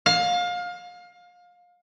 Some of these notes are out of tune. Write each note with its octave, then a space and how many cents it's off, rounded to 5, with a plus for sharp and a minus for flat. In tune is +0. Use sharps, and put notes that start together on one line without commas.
F5 +25